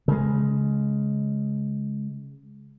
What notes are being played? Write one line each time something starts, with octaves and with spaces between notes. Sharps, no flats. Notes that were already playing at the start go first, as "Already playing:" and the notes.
C#3 G#3